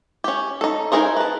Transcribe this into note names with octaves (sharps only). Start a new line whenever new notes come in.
C#4 G4
D#4 A4
D#4 E4 G#4 A#4 C5
B4 A5